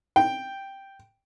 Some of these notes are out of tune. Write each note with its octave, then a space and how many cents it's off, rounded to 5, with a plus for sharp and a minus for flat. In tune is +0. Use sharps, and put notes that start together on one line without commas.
G5 +0